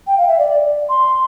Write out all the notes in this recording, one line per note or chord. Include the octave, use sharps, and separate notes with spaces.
G5
F5
E5
D5
C6